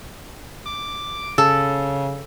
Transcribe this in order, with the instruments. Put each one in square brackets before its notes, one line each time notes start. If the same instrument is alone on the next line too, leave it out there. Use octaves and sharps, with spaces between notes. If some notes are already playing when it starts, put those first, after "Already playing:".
[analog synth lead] D6
[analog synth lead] C#3 [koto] A4